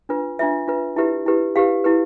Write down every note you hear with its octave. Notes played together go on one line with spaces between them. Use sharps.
D4 F4 B4
D4 F4 B4 E5
D4 F4 B4
E4 G4 B4 E5
E4 G4 B4
E4 G4 B4 F5
E4 G4 B4